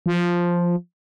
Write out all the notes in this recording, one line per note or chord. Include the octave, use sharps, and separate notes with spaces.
F3